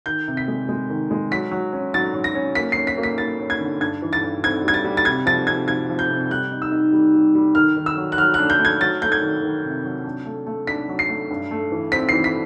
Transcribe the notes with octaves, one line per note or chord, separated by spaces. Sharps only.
D#3 G6
C3
B6
G#3
G#3
D#3
G#3
F#3 B6
F#3
C#4
F#3 A6
F#3
A#6
C#4
A#3 B6
C#4 C7
B6
A#3
B6
A#3 A6
C#4
G#6
D3
G2 G#6
E3
A6
G2
C4 G#6
G3 G#6
A6
G3
A6
C3 G#6
F3 A6
C3 G#6
F3 G#6
F3
G6
C3
G3 F#6
D#4
E6
D#4
G3
G3
G3
D#3 F6
D#3
E6
F#3
F#6
F#3 F6
D4 F#6
G6
A3
G#6
F#3 A6
A3 G6
G#6
D#3
D#3
C3
F#3
D4
A3
A3
D4 B6
F#3
C7
A3
G2
A3
E3
C4 B6
E3 C7
B6